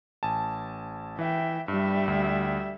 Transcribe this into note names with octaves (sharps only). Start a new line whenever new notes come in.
A1 G#5 A5
E3 E5 G5
G2 G3 E5
D2